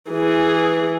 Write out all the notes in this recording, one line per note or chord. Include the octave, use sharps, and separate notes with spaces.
E3 G#4